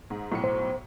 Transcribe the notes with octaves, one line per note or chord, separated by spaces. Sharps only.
G#2
B1 A2 C#7
C5